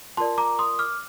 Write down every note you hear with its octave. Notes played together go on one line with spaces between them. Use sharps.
F4 A#4 D5 A5 C6
A#5 D6
C6 D#6
D6 F6